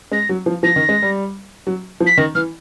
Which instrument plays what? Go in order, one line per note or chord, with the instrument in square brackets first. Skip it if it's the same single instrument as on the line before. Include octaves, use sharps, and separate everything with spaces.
[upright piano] G#3 [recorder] A#6
[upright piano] F#3
F3
[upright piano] F3 [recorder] A#6
[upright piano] D#3
G#3
G3
F#3
F3
[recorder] B6
[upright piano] D#3 [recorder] A#6
[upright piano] E3 [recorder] F6